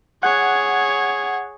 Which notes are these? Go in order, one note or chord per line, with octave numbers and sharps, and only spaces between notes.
G#4 C#5 F#5